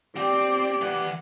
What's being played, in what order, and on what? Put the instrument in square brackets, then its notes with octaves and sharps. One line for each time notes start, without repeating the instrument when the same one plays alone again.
[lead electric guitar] C4 [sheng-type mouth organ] G4 [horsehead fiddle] D5
[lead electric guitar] E3 F#5